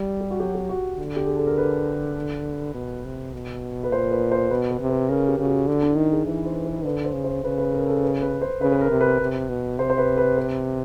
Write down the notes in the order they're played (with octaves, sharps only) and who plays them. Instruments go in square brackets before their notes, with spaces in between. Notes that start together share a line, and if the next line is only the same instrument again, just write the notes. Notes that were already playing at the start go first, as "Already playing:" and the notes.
Already playing: [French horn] G3
[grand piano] G4
F#4
[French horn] F#3 [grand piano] G4
[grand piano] G4
F#4
[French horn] D3
[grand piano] G4
G#4
A4
A#4
B4
[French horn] B2
C3
B2
[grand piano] B4
[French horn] A#2 [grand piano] C5
[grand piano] B4
C5
[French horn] B2 [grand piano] B4
[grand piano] B4
[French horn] C3
[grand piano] B4
[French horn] C#3 [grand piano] A#4
[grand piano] G4
[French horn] C#3 [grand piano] F#4
[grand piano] G4
[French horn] D3 [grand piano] F#4
[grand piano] D4
E4
[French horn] D#3 [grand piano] D#4
[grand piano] G#4
[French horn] E3 [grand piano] B4
[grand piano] C5
B4
[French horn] D3 [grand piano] B4
[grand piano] C5
[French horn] C#3
[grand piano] C5
[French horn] C#3 [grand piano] B4
[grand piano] B4
A#4
A4
B4
B4
C5
[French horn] C#3 [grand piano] B4
[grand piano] B4
A#4
[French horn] C3
[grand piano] B4
[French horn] C3
B2
[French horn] C3 [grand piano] C5
[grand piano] C5
B4
B4
B4